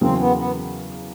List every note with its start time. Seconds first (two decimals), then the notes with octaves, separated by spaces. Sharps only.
0.01 E2 C#3 F#3 A#3 C4
0.19 B3
0.38 B3